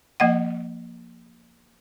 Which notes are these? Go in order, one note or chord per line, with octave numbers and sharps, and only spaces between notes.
F3 A#3 D#5 F#5